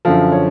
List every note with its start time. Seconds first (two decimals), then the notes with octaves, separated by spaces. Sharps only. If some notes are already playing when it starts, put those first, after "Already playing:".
0.05 F#2 D3 F3 F5
0.32 C#5